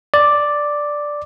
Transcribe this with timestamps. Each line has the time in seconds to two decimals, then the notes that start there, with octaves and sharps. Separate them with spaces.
0.14 D5